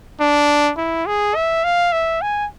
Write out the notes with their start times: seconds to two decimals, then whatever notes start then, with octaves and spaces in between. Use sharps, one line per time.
0.20 D4
0.78 E4
1.07 G#4
1.35 E5
1.64 F5
1.92 E5
2.22 G#5